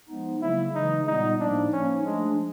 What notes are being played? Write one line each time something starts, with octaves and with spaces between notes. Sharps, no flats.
F3 G#3 B3 D#4
C#3 F#3 A#3 E4
C#3 E3 G#3 D#4
A#2 G3 B3 D#4
A2 F3 A#3 D4 D#4
F3 A#3 C#4 D#4
F3 G#3 A3 D4